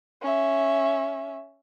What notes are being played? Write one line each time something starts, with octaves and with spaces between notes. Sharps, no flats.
C#4 E5